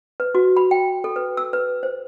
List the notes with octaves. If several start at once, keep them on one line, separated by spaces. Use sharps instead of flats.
B4
F#4
B5
G5
A4
B4
E6
B4
C5